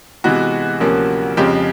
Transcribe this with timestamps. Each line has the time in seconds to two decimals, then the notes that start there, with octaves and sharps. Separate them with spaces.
0.24 C3 E3 G#3 B3 F#4
0.80 D2 C3 F3 A#3 C#4
1.37 F2 C#3 F3 G#3 C4 G4